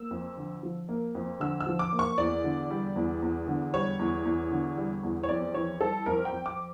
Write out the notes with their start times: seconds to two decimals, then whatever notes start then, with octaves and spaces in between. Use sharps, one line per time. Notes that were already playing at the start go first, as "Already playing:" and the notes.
Already playing: A#3 E6
0.11 F2
0.37 D3
0.63 F3
0.89 A#3
1.15 F2
1.40 D3 E6
1.60 E6
1.67 F3
1.79 D6
1.93 A#3
1.99 C#6
2.18 E2 D5
2.44 D3
2.70 G3
2.96 E2
3.22 E2
3.48 D3
3.73 G3 C#5
3.99 E2
4.25 E2
4.52 D3
4.77 G3
5.03 E2
5.23 C#5
5.29 F2 D5
5.54 E3 C#5
5.80 G3 A4
6.06 F2 A#4
6.25 G5
6.32 F2
6.46 D6